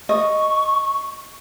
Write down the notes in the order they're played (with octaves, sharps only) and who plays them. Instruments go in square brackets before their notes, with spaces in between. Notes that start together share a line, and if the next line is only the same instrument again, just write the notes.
[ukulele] D#5 [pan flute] C#6